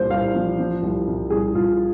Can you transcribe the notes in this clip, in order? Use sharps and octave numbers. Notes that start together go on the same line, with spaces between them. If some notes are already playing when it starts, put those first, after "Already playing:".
Already playing: C2 A#2 C5
C2 F5
F3
F3
C2
C2
C2 G#4
C2 F4